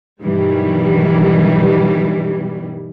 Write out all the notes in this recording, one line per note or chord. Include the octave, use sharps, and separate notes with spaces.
G2 B2 D#3 E3 F#3 G3